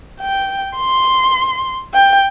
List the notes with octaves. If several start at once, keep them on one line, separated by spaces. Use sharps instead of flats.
G5
C6
G5